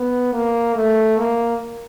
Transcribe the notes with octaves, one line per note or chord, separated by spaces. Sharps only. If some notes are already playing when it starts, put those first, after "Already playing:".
Already playing: B3
A#3
A3
A#3